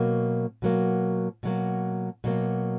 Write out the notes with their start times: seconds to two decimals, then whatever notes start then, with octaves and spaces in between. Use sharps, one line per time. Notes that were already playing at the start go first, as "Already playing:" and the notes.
Already playing: B2 F#3 A#3
0.62 B2 F#3 A#3
1.43 B2 F#3 A#3
2.24 B2 F#3 A#3